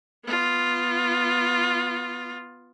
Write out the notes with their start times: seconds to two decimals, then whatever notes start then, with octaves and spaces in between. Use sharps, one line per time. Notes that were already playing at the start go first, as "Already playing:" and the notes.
0.24 B3 F4